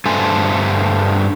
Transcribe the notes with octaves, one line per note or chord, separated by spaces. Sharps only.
G2 A3 A4 C5 G#5